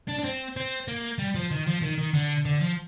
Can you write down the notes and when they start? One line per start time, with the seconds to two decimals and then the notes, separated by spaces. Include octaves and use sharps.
0.09 D4
0.19 D4
0.25 C4
0.57 C4
0.88 A#3
1.18 G3
1.35 F3
1.51 D#3
1.67 F3
1.82 D#3
1.98 D#3
2.14 D3
2.45 D3
2.60 F3